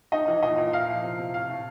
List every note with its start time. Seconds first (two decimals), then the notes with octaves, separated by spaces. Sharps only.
0.12 D#4 D#5
0.28 E3
0.42 A#2 D#5
0.58 A#2
0.73 E4 F5
0.88 F3
1.03 C3
1.18 C3
1.34 A2 F5
1.49 A2